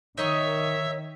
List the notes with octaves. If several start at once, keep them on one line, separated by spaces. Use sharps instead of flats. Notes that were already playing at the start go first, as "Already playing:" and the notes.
D#3 D#4 C#5 D#5 E5 E6